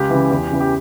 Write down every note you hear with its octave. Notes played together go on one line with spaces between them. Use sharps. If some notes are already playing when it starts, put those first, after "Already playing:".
Already playing: C#2 G4
C#3 E3
E2
C#3 E3
G4